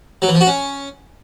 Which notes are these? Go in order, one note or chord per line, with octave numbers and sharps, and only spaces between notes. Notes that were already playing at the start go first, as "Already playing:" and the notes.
F#3
E3
F3
F#4
C#4